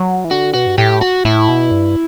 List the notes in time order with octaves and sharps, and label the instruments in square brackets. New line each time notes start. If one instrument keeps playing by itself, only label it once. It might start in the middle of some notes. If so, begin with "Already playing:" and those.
Already playing: [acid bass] F#3
E3
[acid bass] D3 [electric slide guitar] F#4
[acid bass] B2 [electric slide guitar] F#4
[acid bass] G2
[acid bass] A2 [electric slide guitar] G4
[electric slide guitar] F#4
[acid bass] A2 [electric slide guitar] E4
[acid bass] B2
G2